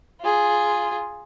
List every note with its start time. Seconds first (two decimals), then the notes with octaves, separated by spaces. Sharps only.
0.21 F4 G#4